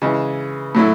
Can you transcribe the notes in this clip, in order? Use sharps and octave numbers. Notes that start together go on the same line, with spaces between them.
C#3 E3 G#3
A2 F#3 A3 E4